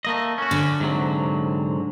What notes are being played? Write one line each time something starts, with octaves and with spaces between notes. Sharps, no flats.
A3 A#3 D#5
C#4 F#4
D3
G#2 C3 F#3